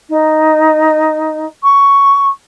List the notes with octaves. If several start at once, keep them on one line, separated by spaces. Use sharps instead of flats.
D#4
C#6